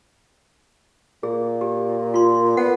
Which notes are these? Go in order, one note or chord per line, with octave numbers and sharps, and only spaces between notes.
A#2 G#4
G4
F4 C6
B3 F#5